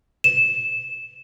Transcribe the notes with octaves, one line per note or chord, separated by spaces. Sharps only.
E7